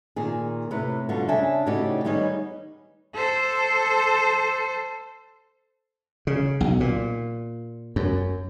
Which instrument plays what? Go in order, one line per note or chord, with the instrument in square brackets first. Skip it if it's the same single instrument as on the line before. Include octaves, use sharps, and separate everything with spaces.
[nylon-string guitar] A#2 D#3 G#4
A2 C3 B4
B2 D3 G3 F4 F#4
C#3 D4 E5 G#5 A5
A2 C#3 D#4 F#4 G4 D5
D#3 G3 B3 D#4 G#4 C#5
[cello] A4 C5
[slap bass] C#3
B1
A#2
F#2